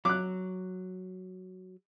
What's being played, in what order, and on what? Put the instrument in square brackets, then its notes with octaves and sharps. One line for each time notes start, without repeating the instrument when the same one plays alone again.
[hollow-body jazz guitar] F#3 [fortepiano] D6 F#6